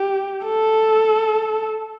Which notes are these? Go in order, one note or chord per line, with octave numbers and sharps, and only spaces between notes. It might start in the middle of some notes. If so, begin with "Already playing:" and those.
Already playing: G4
A4